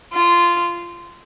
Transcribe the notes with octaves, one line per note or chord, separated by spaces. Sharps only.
F4